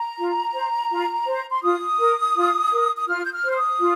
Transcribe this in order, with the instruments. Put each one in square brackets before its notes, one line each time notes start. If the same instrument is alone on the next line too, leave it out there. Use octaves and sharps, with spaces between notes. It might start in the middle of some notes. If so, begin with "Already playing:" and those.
Already playing: [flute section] A#5
F4
C5
F4
C5
C6
F4 D#6
A#4
F4
A#4
D#6
F4 F6
G6
F6
C5
F6
D#6
F4